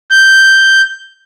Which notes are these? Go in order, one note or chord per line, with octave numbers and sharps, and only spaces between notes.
G6